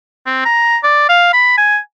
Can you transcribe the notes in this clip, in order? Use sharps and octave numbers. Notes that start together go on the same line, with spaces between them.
C4
A#5
D5
F5
B5
G#5